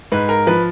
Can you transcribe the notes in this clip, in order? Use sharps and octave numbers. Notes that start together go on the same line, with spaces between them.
G#2 B4
A#4
F3 B4